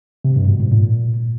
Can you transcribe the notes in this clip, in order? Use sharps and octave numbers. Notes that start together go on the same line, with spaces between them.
C3
G2
B2
G#2
A#2